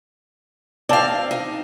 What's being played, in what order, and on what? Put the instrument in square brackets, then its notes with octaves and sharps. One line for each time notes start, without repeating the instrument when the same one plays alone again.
[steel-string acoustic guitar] C4 F5 [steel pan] D5 A5
[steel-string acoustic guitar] D#4